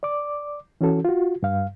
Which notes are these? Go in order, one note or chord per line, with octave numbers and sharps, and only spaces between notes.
D5 D6
E3 C#4 F#4 A4
F4 F#4
G2 F5